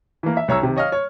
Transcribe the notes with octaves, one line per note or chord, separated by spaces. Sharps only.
E3 A#3
E5
C2 C#5 A#5 E6
C3 D#3
C#5 D#5 F5 F6
C#5